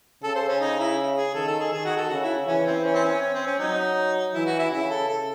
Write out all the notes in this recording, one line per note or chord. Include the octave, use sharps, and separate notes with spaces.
C#3 A4
C5
C#4
D#4
E4
G#4
D#3 A4
A4
G#4
D#3 G#4
F#4
A4
C#3 F#4
E4
E3 C#4
C4
C#4
C4
C#4
C#4
C4
C#4
F#3 D#4
E3 E4
F#4
E4
C#3 E4
A4
A4